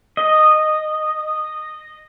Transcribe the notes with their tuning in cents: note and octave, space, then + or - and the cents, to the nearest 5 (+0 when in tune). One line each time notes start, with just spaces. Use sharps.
D#5 -10